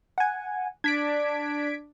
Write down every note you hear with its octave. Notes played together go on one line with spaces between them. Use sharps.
F#5 G#5
D4 G#6 B6 D7